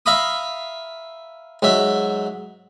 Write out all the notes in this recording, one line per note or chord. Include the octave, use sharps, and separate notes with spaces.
E5 F5 A#5 B5 D#6
G#2 F#3 E5